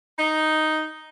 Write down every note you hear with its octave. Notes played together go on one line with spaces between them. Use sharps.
D#4